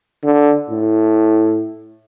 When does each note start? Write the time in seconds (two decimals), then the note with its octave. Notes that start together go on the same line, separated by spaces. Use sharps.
0.23 D3
0.70 A2